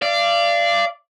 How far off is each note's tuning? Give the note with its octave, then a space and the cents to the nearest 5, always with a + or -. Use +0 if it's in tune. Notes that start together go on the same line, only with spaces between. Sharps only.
D5 +0 F5 -30